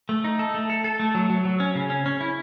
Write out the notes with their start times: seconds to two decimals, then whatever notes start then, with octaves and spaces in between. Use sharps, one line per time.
0.09 A3
0.24 D#4
0.39 A4
0.54 A3
0.70 A4
0.84 A4
1.00 A3
1.15 F#3
1.30 F#3
1.45 F#3
1.60 C#4
1.75 C#3
1.90 C#4
2.06 C#4
2.21 E4